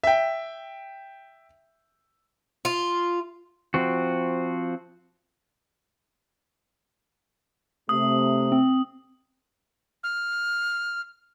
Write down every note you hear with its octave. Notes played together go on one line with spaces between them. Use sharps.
E5 G5
F4
F3 C4 F#4
C3 A3 D#6
C4
F6